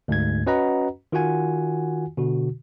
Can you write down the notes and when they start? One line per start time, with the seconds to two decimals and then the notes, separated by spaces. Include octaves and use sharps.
0.08 D2 G#2 G#6
0.46 C#4 F#4 B4 D#5 F#5 A#5
1.12 D#3 F4 F#4 F#5 G#5
2.17 B2 D3 F#4